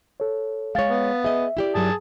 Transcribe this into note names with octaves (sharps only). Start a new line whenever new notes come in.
A4 C#5
G#3 C#5 F5 A6
B3
G#4 D#5 E5
E4 G4 D5
G2 F#3 G#4 A5